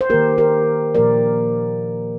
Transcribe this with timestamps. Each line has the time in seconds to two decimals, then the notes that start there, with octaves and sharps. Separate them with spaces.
0.01 C5
0.10 D#3 A#3 G4 A#4
0.38 G4 A#4
0.95 A#2 F3 A#3 A#4 D5